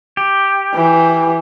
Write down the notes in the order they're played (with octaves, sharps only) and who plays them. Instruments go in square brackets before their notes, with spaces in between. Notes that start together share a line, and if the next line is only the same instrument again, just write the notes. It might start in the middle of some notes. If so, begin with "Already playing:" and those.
[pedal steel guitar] G4
[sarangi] E3